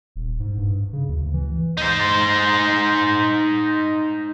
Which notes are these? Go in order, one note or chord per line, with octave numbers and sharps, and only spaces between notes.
D#1
G#2
G2
C#3
D2
E3
D#4 C5